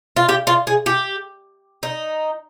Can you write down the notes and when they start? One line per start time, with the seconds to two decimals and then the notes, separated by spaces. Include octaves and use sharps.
0.16 F4
0.29 G4
0.47 F4
0.67 G#4
0.86 G4
1.83 D#4